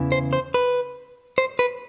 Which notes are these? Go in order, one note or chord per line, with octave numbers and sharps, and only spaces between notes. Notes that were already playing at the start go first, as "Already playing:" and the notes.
Already playing: E2 C#3 E3
C5
C5
B4
C5
B4